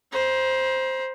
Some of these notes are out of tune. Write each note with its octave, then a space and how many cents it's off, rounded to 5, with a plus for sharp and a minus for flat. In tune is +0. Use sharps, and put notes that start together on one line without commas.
C5 +0 A#5 +45